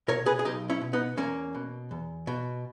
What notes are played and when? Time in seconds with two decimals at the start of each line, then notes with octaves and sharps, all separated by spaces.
0.08 B2 A#4 C#5
0.26 G#4 B4
0.39 G#4
0.45 B1 D#4 G4
0.70 C#4 E4
0.81 B2
0.93 B3 D#4
1.17 E2 A#3 C#4
1.54 B2
1.91 E2
2.27 B2